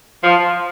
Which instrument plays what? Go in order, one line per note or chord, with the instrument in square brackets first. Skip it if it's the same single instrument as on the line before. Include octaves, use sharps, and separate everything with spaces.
[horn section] F3